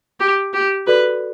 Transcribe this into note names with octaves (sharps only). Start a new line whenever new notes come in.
G4
G4
F#4 A4 B4 D5